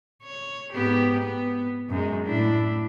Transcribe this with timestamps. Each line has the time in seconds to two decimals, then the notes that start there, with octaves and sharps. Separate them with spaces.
0.23 C#5
0.73 G#2 B3 G4
1.19 B3
1.89 F#2 G#3
2.25 A2 D4 E4